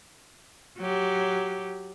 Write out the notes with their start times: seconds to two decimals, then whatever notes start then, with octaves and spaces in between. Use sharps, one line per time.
0.79 F#3 G4